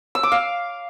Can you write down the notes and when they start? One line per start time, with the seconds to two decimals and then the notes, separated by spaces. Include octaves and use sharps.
0.15 E6
0.23 D6
0.32 F5